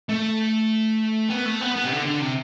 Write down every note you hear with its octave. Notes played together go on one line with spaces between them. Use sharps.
A3
B3
A3
B3
B3
C3
D3
D3
C3